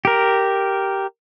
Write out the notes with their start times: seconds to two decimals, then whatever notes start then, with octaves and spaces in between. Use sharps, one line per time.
0.05 G4 A#4